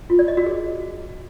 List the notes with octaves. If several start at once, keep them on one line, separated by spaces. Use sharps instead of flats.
F4
D5
D#5
F#4
G#4